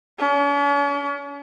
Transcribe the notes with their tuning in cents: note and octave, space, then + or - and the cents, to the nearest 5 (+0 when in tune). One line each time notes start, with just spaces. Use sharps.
C#4 +45